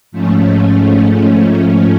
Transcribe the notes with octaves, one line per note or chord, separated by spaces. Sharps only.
G#2 F3 A3 C#4